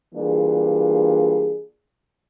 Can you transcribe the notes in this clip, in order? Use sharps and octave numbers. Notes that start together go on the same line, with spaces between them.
E3 G3 A#3 D4 F4 G#4